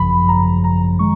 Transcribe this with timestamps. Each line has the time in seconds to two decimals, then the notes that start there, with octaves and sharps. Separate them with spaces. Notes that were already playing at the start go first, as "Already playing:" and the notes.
Already playing: G#1 F#2 C#3 F3 B5
0.29 A#5
0.64 A#5
0.99 D#3 G#3 C#6